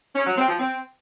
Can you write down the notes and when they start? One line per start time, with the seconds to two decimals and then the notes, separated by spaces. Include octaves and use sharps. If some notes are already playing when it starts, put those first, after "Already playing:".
0.15 C#4
0.27 F#3
0.38 C4
0.49 F3
0.60 C4